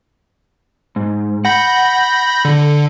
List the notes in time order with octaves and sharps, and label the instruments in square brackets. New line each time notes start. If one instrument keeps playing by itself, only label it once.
[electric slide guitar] G#2
[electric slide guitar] F#5 [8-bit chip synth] B5 G6 A#6
[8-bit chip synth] D3